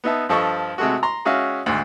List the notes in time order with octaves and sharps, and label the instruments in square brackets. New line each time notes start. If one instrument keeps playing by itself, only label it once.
[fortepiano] B3 D#4 E5 A5
G2 F3 A4 D#5 C#6
C3 G#3 A3 F#4
A#5 C6
G#3 C#4 F#4 E5 F5
D2 G#2